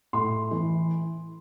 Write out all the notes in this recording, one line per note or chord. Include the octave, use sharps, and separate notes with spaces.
A2 C6
E3